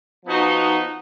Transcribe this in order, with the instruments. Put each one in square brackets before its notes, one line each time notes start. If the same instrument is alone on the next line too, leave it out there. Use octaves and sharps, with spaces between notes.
[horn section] F3 B3 D#4 F#4